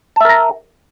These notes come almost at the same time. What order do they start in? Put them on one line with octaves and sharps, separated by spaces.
A5 E5 A#4 A#5